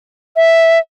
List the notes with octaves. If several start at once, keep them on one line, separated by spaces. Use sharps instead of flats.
E5